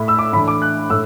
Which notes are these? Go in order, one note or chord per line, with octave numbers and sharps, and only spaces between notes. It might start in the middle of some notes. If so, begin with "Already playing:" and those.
Already playing: A2 A3 E4 B5
E6
D6
A2 E3 D4 B5
D6
F#6
A2 E6